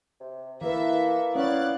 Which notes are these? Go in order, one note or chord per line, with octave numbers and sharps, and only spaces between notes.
C3
E3 A#3 A4 B4 E5
B3 C#4 C#5 D5 F5 F#6 A6